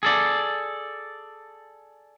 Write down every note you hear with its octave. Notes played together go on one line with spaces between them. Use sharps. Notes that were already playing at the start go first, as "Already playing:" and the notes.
G#4 A4 D5